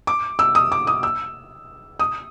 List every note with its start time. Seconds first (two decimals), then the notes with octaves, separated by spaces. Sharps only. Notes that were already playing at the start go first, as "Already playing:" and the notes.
0.07 D6
0.39 E6
0.55 D#6
0.72 D6
0.87 D#6
1.03 E6
1.99 D#6